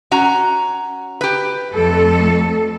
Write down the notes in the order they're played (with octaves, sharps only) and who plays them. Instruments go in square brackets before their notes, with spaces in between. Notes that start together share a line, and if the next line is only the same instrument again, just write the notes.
[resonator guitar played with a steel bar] C#4 F#4 A#5
G4 B4
[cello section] F2 A3 A4